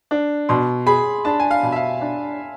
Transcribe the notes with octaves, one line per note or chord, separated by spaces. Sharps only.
D4
B2 C6
G#4 B5
D4 A5
G#5
F5
B2
E5
F5
D4